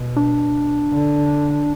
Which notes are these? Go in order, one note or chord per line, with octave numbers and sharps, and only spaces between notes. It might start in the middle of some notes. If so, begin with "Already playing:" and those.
Already playing: B2
D4
D3